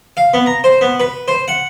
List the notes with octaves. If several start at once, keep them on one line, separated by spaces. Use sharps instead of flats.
F5
B3
A#5
C5
B3
B4
C5
F#5